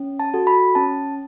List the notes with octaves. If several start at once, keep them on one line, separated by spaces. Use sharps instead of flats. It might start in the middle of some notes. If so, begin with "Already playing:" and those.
Already playing: C#4
A5
F#4 A4
B5
C#4 A5